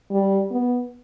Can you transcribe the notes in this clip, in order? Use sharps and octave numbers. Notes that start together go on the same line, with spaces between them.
G3
B3